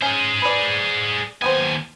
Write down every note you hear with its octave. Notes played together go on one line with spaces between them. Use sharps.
C#4 G#4 C5
B4 D5
D#2 B3 G4 C5 G#5